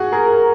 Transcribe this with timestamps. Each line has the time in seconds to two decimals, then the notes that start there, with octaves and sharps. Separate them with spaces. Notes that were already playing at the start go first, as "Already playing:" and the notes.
Already playing: F#4 G#4
0.12 G#4 A#4